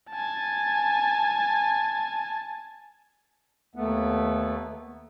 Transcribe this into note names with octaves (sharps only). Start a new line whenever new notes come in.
G#5 A5
D#2 A3 B3